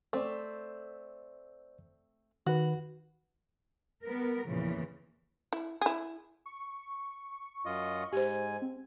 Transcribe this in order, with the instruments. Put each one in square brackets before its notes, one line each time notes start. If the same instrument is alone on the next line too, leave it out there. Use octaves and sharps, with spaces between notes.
[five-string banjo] A3 C4 [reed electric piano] C5 D5
[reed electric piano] D#3 B4 [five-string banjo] F#4
[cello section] G3 B3 A#4
E2 A#2 C#3 E3 F3
[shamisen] E4
E4 G#4
[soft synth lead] C#6
[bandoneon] F#2 F4 D#5
[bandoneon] G#2 G#5 [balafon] G4 C5
[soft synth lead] C4